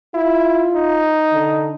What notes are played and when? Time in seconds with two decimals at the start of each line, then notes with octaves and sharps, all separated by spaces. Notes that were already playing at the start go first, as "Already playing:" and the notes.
0.14 E4 F4
0.74 D#4
1.33 D3